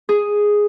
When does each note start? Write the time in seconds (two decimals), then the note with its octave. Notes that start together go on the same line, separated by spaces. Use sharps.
0.09 G#4